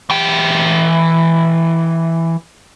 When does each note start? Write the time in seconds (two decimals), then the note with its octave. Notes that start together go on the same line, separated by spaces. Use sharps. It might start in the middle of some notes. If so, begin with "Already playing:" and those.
0.10 E3 G5